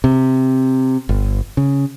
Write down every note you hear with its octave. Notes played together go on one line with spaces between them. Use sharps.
C3
G1
C#3